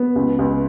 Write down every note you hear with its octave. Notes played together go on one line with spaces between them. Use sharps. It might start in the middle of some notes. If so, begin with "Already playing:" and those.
Already playing: B3
C#2
C#2